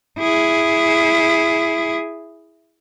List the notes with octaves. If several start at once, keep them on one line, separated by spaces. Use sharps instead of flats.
E4 G#4